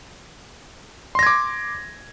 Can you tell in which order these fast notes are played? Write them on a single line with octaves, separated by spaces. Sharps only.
C6 A#6 G#6 D6